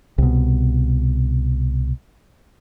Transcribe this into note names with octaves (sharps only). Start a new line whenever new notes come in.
C2 B2